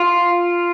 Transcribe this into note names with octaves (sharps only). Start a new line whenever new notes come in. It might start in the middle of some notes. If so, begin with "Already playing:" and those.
Already playing: F4